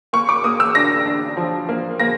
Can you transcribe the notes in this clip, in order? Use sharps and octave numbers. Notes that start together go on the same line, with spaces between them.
A#3 C#6
D6
A#3 D#6
E6
D4 A#6
D4
F3
A#3
A#3 A#6